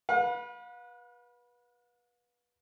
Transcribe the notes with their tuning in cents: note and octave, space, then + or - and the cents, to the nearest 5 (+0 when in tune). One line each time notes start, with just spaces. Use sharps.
B4 -25 F5 +45